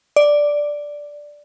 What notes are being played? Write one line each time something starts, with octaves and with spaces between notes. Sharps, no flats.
D5